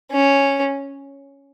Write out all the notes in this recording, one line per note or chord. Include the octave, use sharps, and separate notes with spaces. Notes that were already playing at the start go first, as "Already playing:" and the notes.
C#4